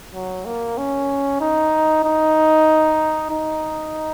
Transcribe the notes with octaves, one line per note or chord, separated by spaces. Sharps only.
F#3
A#3
C#4
D#4
D#4
D#4